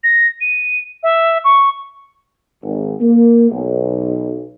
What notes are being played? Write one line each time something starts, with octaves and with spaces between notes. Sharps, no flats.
A#6
D#7
E5
C#6
G#1
A#3
B1